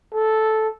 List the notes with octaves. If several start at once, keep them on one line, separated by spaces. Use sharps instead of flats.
A4